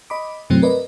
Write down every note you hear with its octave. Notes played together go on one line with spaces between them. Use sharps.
D#5 B5 D6
G2 C3 E3 F#3 A3 C4
A#4 B4 D5 D#5